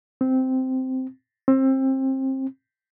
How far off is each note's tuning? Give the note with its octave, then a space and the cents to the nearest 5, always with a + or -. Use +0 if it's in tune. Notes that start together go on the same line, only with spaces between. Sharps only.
C4 -10
C4 +25